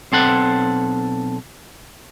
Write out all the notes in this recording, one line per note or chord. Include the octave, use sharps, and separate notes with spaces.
B1 C4 A4 F#5